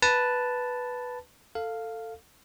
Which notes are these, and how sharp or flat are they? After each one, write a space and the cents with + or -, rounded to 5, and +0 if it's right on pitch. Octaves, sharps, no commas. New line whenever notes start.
B4 +0 A5 +0
A4 +20 F5 +0